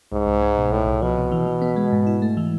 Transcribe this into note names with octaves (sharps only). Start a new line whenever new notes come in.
C2 G#2
C2
G#3
B2
C2 A2
C2
B2 F3
C3
E3
E3
B3
G#3
G#2
E4
A3
E3